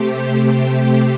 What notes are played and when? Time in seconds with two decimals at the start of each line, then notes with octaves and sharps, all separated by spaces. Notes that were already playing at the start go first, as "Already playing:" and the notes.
Already playing: C3 A3 C4 G4